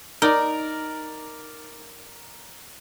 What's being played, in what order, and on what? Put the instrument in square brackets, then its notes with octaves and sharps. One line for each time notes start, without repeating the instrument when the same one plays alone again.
[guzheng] D#4 [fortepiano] A#4 D5 A#5